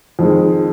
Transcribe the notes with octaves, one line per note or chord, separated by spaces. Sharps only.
F2 D#3 G#3